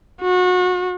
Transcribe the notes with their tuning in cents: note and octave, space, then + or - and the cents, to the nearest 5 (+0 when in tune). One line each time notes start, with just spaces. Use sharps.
F#4 -30